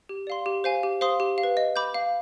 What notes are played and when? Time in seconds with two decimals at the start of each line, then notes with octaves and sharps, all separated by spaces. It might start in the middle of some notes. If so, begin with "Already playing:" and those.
0.09 G4
0.27 D5 F5 C6
0.46 G4
0.64 C5 F5 G#5
0.83 G4
1.01 C5 F5 C6 D#6
1.20 G4
1.38 F5
1.43 B4
1.57 D#5
1.76 B5 D6 G6
1.94 F5